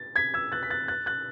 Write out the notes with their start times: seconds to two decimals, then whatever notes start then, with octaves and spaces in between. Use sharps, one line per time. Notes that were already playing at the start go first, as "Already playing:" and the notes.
Already playing: A6
0.16 G#6 B6
0.34 E6 G#6
0.52 F#6 A6
0.63 B6
0.70 F#6 A6
0.88 F#6 A6
1.06 F#6 A6